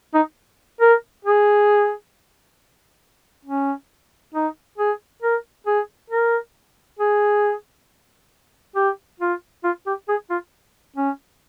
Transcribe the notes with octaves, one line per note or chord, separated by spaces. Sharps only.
D#4
A#4
G#4
C#4
D#4
G#4
A#4
G#4
A#4
G#4
G4
F4
F4
G4
G#4
F4
C#4